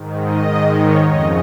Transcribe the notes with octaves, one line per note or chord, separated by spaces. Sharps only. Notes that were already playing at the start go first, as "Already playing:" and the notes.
Already playing: G#2 D#3
D#5
G#2 D#3
C#5
F2 C#3 D#5